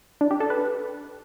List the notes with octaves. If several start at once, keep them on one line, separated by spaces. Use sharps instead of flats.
D4
G4
A4
B4